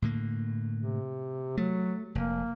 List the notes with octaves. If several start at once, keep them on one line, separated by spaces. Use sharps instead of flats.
A2 D3 A#3
C3
F#3 A3
F1 A#3